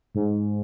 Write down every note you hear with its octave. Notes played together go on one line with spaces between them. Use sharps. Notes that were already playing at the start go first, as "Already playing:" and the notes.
G#2